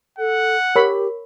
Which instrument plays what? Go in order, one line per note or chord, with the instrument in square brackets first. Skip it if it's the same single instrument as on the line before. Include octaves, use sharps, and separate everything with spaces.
[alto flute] A4 [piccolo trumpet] F#5
[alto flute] G4 [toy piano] A#4 [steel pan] C#5 B5